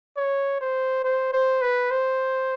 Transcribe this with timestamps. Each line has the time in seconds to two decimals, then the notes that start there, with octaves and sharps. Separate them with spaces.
0.17 C#5
0.61 C5
1.04 C5
1.33 C5
1.62 B4
1.91 C5